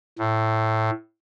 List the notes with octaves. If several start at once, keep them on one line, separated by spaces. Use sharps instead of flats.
A2